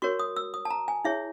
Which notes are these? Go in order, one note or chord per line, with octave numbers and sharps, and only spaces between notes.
F#4 A#4 C#5 C#6
D#6
E6
D#6
A5
A#5
G#5
E4 G#4 C#5 E5